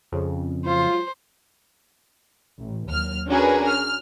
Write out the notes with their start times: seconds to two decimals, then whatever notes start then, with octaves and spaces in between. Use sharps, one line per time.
0.12 F2 C#3
0.66 F#3 G#3 F4 C5
2.59 A1
2.89 D#2 F#3 F6
3.28 C#4 D4 F#4 G#4 A#4 B4
3.68 F6